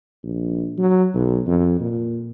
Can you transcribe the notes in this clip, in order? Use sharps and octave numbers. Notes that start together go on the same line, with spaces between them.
A#1
F#3
B1
F2
A#2